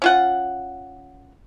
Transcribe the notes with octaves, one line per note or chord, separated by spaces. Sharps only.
C#4 F4 F#5